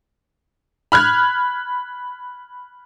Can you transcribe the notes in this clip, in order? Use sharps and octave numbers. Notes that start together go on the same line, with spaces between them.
B5 F6 F#6 G#6